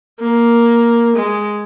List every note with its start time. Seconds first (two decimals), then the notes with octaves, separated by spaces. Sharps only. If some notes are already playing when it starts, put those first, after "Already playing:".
0.21 A#3
1.16 G#3